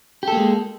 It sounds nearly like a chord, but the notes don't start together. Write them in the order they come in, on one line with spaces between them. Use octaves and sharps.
G4 A4 A#3 G#3